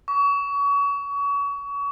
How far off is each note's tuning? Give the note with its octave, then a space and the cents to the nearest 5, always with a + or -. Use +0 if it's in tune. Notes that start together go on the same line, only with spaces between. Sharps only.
C#6 +30